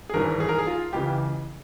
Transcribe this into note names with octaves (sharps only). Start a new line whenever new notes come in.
G#4
G#1 G2 E3 A#4
G#4
A#4
G#4
F4
C#2 C#3 E3 G4